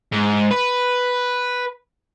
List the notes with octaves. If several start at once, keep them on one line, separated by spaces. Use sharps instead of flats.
G#2
B4